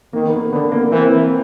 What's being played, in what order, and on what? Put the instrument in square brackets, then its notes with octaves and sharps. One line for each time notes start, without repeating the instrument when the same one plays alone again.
[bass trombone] D#3 [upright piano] A#3
[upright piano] B3
A#3
[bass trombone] D3 [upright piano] B3
[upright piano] A#3
[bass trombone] E3 [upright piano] C4